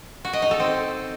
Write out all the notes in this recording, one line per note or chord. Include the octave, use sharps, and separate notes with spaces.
F#4
D#5
D#4
A4
C4